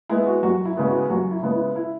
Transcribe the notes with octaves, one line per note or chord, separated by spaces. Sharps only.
G#3 B3 E4
F#4
F#2 F#4
E4
C#3 G#3 B3
F#4
F#2 F#4
E4
C#3 G#3 B3
E4
E4